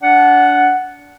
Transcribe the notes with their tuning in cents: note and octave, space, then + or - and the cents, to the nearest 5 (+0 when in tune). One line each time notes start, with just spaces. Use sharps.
D4 -25 F#5 +0